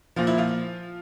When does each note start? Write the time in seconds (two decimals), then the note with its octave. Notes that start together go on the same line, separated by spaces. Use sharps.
0.16 A#2 F3 F4
0.27 E4
0.38 F3 F4